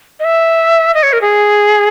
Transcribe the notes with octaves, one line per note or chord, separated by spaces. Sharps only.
D#5
E5
D#5
C#5
A#4
G#4